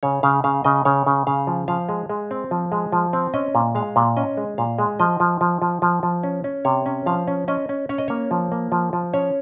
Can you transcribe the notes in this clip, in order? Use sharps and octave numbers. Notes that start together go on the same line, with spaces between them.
C#3 C#5
C#3 F5
C#3 F5
C#3 D#5
C#3 C#5
C#3
C#3 F5
F3
F3 F5
G#3
G#3
C4
F3
G#3
F3
C4
C#4 D#5
A#2
G#3 F5
A#2
C#4 D#5
G#3
A#2 F5
G#3
F3 D#5
F3
F3
F3
F3
F3
C#4
C#4
C3 C#5
C#4
F3 F5
C#4
C#4 D#5
C#4
C#4 C#5
D#5
A#3 C#5
F3
A#3
F3
F3
C#4 C#5